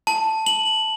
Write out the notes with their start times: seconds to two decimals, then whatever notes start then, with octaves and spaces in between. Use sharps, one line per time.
0.07 A5
0.46 F#7